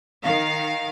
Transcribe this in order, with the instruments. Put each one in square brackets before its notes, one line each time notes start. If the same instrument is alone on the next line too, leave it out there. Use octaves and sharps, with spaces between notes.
[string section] D#3 F5